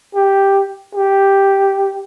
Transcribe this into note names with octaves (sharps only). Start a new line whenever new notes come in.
G4
G4